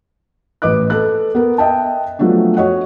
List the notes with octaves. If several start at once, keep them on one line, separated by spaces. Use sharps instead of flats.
A1 B4 D#5 D6 F#6
A4 B4 F#6
B3 A#4
D#5 E5 G5 A5
F3 F#3 A3 B3 D4
F#4 C#5 D#5 F#5